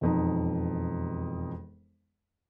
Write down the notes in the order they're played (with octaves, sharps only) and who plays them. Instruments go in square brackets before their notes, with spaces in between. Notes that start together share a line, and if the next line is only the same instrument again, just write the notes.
[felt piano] E1 F2 D#4